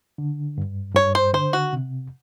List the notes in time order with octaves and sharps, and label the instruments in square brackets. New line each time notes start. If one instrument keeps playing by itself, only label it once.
[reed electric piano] D3
G2
[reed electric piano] G2 [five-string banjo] C#5
[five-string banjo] C5
[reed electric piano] D3 [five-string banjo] C5
[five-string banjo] F#4
[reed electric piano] C3